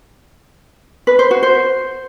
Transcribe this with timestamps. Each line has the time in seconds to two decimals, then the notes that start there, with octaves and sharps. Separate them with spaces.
1.07 B4
1.19 C5
1.31 F#4
1.43 C5